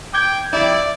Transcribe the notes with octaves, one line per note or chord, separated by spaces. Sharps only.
G5 D6 G6 G#6
F2 G3 E4 D5